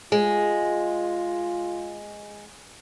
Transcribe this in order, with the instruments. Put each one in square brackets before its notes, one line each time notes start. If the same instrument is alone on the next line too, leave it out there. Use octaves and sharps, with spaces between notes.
[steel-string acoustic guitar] G#3 [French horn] F4